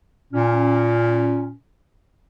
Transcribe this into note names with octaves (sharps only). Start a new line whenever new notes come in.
A#2 C#4